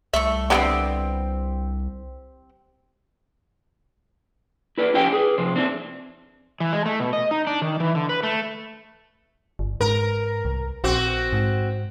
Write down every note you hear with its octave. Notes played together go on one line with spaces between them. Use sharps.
C2 A3 E5 C#6
D3 G3 B3 C4 F4 G4
E4 B4 D5
C#4 E4 G4 C5 G5
G#4 B4
F2 C3 C5
C4 D4 E4
E3
G#3
A3
B2
D#5
D#4
D4
D#3
E3
D3
B4
A3
G1
G#2 A#4
C2
A#1 C4 F#4
G#2